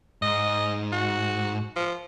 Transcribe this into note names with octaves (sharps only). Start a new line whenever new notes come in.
G#2 D#5
F#4
F3